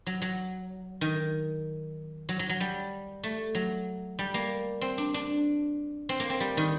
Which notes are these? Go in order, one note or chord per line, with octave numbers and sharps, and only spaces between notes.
F#3
F#3
D#3
F#3
F#3
F#3
G3
A3
F#3
G3
A#3
C4
D4
D4
C4
A#3
C4
G3
D#3